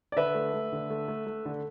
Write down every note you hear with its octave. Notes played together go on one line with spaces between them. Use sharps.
D5
D3 B4 E5
A3
A3
D3
A3
A3
A3
D3